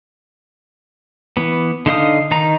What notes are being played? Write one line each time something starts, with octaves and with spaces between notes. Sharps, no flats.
E3 B3
D3 D#4 F5 D#6
D#3 D#4 A#5